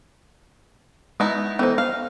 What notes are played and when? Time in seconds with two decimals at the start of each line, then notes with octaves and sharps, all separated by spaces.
1.20 G#3 B3 D#4 E4
1.59 E3 B3 D#4 A4 C5
1.78 F5